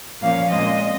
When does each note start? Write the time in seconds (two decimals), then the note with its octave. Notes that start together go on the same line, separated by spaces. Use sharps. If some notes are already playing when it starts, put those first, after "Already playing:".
0.22 A#2 F3 A#3 C#4 F5
0.50 A#2 G#3 C4 D#5